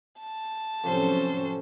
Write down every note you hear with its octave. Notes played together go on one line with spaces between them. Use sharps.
A5
F2 A2 C3 F#3 C#4 A4 C5